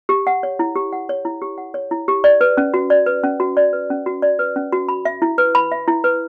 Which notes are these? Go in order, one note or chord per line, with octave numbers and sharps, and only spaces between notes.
G4
F#5
C#5
E4
G4
F#5
C#5
E4
G4
F#5
C#5
E4
G4
D5
B4
C#4
F#4
D5
B4
C#4
F#4
D5
B4
C#4
F#4
D5
B4
C#4
F#4
B5
E5
E4
B4
B5
E5
E4
B4